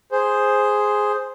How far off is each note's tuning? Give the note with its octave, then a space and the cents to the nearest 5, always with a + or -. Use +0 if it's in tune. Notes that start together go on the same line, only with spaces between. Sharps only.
G#4 +0 C5 +0